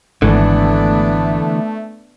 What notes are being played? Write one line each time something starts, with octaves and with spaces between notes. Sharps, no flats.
G#1 D3 E3 A3 B3 D4